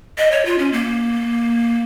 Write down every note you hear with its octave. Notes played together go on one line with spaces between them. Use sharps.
D#5
C#5
F4
C#4
A#3